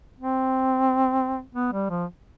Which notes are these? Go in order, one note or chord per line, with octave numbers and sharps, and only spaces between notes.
C4
B3
G3
F3